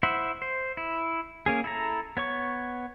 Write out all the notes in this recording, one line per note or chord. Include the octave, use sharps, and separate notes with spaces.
E4 C5 E5 F#5
C5
E4
A#3 C#4 G#4
E4 A4 A#5
B3 C#5 C#6